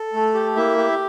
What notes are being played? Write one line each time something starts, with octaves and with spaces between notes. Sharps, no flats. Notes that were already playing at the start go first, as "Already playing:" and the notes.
Already playing: A4
A3
G4
A#3 E4 E5
G4